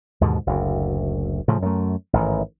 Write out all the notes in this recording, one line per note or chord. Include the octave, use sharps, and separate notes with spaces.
D#2 G#2 B2 D3
F#1 D2
A2 C#3 F3
F#2 A3
A1 G#2 D#3